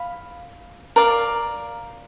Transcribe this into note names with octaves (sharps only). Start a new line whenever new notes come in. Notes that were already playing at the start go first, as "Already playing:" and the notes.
Already playing: F5 B5
A#4 D5 F5